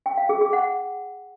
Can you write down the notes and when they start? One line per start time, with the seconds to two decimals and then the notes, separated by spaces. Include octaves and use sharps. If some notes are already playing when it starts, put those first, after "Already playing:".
0.06 G5
0.18 F5
0.29 G#4
0.41 G#4
0.53 F#5